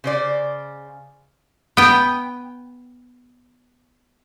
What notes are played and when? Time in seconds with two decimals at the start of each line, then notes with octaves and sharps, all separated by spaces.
0.04 C#3 C5 D5
1.77 B3 G5